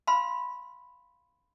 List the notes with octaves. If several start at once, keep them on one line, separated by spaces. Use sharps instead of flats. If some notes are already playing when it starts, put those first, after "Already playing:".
F5 B5 C6